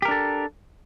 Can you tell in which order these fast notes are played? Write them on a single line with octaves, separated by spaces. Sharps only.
G4 A#4 D4 A4